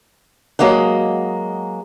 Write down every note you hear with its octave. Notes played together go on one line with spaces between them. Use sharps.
F#3 G#3 A#3 D#5 F#5